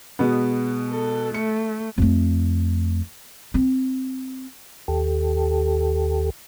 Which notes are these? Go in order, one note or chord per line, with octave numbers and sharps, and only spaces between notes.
B2 G#3 B3
A4
A3 C#7
F2 A3
C4
D#2 G4 A4